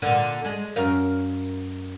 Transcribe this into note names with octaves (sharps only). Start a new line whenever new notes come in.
A#2 D3
G#3
F#2 A#4 F5